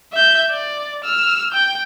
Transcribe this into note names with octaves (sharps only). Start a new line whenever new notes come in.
E5 G6
D5
E6 F6
G5 G6